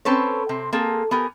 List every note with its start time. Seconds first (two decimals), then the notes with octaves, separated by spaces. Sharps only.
0.05 C4 C#4 A4 B4 C#5
0.49 C3 C4
0.73 A#3 C4 G#4 A4
1.11 B3 G4 A#4 G#5